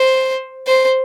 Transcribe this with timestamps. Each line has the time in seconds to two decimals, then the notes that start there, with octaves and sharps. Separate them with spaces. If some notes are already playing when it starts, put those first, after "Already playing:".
Already playing: C5
0.67 C5